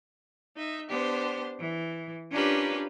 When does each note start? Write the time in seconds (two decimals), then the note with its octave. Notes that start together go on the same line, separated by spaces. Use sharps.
0.55 D#4 E5
0.90 B3 D4 G4 C5
1.60 E3
2.31 C#4 D4 F4 G4 A#4 B4